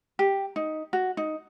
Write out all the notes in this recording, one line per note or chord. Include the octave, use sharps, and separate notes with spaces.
G4
D#4
F#4
D#4